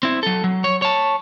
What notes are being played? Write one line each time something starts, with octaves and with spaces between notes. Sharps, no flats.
C4 E4
F#3 A4
F#3
C#5
C#5 A5